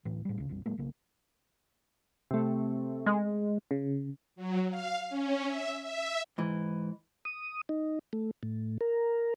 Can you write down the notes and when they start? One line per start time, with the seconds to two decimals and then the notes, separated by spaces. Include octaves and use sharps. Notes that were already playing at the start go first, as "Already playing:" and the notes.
0.05 D1 A2 E3
0.25 A2 G3
0.38 C#2 C#3
0.49 A#1 F2 G3
0.66 A2 F#3 G#3 A#3
0.78 B1 C#3 A#3
2.31 C3 A3
3.06 G#3
3.71 C#3
4.36 F#3
4.69 F5
5.09 C#4
5.45 E5
5.82 E5
6.38 G#2 E3
7.25 D#6
7.69 D#4
8.13 A3
8.43 A2
8.81 A#4